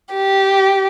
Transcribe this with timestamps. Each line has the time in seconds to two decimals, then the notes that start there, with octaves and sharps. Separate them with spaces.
0.14 G4